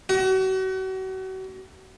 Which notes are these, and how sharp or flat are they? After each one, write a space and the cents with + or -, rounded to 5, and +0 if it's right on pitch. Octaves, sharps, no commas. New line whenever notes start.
F#4 +35